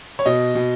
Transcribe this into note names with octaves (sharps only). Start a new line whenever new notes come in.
C#5
B2 D#5
B2